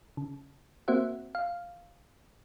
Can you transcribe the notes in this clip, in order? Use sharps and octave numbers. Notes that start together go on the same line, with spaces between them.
C#3
A#3 C4 F#4 C5 E5 F#5
F5